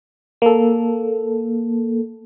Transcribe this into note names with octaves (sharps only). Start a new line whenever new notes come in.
A#3 A4